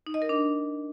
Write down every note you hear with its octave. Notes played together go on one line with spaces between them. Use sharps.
D#4
D#5
A#4
D4